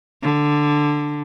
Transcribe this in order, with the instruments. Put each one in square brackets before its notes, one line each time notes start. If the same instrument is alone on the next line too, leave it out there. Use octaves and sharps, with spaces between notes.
[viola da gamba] D3